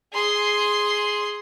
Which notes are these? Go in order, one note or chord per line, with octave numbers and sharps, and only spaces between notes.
G#4 C6